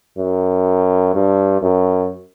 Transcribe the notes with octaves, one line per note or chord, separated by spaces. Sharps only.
F#2
G2
F#2